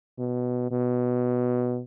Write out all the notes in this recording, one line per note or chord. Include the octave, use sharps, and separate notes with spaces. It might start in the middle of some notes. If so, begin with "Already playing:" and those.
B2
B2